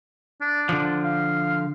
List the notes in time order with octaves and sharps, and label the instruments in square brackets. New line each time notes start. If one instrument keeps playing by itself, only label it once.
[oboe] D4
[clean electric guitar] D3 F3
[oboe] F5